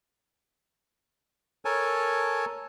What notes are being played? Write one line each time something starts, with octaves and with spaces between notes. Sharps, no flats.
A4 A#4 C#5 G#5 A5